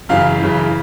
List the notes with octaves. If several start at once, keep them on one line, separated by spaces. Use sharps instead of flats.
F#2 C#3 E3 F5
F#2 C#3 E3